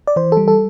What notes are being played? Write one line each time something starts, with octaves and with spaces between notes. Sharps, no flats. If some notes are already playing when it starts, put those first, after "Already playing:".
D5
E3 C5
G3 A4
A4